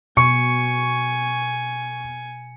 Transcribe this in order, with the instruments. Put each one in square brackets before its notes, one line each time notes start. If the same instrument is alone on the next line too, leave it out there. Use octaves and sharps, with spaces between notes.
[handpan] B2 [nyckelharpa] G#5 [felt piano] C#6 [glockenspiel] C#7